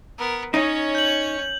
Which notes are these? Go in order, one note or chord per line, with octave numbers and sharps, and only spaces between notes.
B3 A#4
C#4 D#4 C#5
G6 F#7